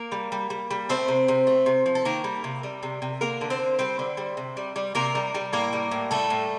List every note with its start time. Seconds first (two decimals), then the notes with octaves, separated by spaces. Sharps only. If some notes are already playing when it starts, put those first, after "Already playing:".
Already playing: A#3 A#4
0.12 G3
0.32 G3
0.50 G3
0.71 G3
0.89 A3 C4 C5
1.08 C3
1.28 C3
1.47 A3
1.66 C3
1.86 F3
1.95 A4
2.05 D#3 A#3 A#4
2.24 G3
2.44 C3
2.63 G3
2.83 C3
3.02 C3
3.21 D3 A#3 A#4
3.41 D3
3.50 C4 C5
3.60 D3
3.79 G3 C4 C5
3.99 D3
4.17 G3
4.37 C3
4.57 G3
4.76 G3
4.95 C3 A#3 A#4
5.15 G3
5.35 G3
5.53 A2 A#3 A#4
5.73 G3
5.91 A2
6.11 G3 A3 A4
6.30 A2